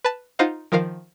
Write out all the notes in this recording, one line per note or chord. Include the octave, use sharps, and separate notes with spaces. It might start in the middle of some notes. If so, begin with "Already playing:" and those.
B4 A5
D#4 F4 C5 D#5 F5 F#5
D#3 F3 A#4 F5